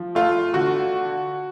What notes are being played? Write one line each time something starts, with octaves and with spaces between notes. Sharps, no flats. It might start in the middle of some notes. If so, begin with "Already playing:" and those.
Already playing: F3
A3 F4
D3 F#4